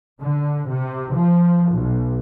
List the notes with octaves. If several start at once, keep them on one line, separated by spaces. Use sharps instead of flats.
D3
C3
F3
B1